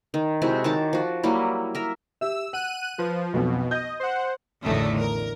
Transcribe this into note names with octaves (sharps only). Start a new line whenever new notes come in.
D#3
C3 G#3 E4 F#4
D#3 C#5 A5 D6
F3 F#4
F#3 G3 A#3 E4
A#4 E5
G4 E5 E6
F#5 F#6 D#7
F3 B4
B1 F2 B2
D#5 G6
C5 F#5
A1 E2 A2 D3 D#3 A3
A#4